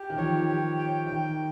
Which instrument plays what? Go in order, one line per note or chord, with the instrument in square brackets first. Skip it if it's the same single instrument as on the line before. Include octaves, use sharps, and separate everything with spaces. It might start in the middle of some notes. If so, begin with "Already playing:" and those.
Already playing: [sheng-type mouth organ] G4
[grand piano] D#3
[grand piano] F3 [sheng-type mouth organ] C#5
[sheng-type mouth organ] G4
G5
[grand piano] D#3 [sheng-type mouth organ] G5